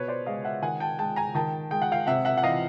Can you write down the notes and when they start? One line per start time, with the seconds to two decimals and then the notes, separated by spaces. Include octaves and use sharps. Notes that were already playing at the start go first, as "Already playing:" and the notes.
Already playing: B2 B4 C#5
0.08 C5 D5
0.26 G#3 D#5 F5
0.45 E5 F#5
0.62 D#3 F#5 G#5
0.80 G5 A5
0.99 G#3 G5 A5
1.16 G#5 A#5
1.35 D#3 G5 A5
1.71 G#3 G5
1.82 F#5
1.92 F5 G5
2.07 C3 E5 F#5
2.25 E5 F#5
2.38 F#5
2.43 E3 D#5 F5